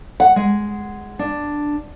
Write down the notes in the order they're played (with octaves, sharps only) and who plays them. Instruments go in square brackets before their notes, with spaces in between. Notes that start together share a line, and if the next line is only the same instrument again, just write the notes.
[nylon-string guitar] F#5
G#3
D4